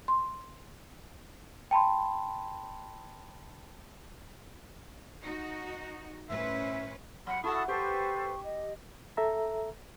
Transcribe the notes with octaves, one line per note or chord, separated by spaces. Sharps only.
C6
G5 A5 B5 C6
D#4 F#4
G1 A2 C#4 B4 C5 E5
F#3 F#5 B5
E4 F#4 A4 A5 C#6 D#6
G4 A4 B4 C5 C#6
D#5
A4 E5 A#5